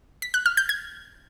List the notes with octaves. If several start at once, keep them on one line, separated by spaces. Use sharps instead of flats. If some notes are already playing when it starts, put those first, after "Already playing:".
B6
F#6
F6
G6
G#6